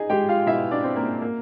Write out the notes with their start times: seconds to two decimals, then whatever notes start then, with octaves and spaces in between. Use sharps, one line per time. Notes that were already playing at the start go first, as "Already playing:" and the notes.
Already playing: D#4 G#4 G#5
0.10 G#3 G4 G5
0.29 F4 F5
0.46 B2 E4 E5
0.71 D4 D5
0.84 C4
0.96 A#3 A#4
1.21 A#3